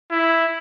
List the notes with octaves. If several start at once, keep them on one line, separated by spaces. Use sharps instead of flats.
E4